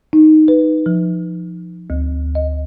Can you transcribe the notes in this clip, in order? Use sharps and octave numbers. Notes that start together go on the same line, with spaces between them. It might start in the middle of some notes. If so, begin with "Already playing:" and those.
D#4
B4
F3
D2
D#5